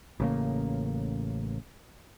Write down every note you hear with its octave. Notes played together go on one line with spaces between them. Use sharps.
A1 C#3 A#3